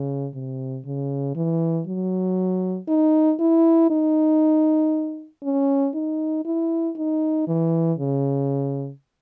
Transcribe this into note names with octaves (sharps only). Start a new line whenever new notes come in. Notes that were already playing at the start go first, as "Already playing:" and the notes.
Already playing: C#3
C3
C#3
E3
F#3
D#4
E4
D#4
C#4
D#4
E4
D#4
E3
C#3